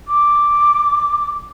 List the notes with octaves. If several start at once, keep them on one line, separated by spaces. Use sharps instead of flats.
D6